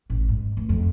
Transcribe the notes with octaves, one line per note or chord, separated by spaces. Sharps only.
A1
G#2
F1
F2